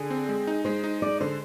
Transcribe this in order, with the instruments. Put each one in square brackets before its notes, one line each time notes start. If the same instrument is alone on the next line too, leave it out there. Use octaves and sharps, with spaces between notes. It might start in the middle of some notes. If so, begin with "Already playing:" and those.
Already playing: [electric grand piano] D3 [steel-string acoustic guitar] G#4
[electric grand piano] C4
G#3
D#4
[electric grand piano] G#3 [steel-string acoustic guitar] C5
[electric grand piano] D#4
[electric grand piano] G#3 [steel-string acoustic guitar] D5
[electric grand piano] D3 [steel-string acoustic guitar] C5